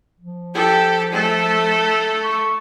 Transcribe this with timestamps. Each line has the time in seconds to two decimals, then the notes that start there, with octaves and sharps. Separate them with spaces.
0.20 F3
0.54 G4 A4
1.12 A3 A4
2.23 C#6